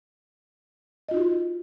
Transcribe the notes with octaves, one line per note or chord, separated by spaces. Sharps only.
D#4 F4 F#4 D#5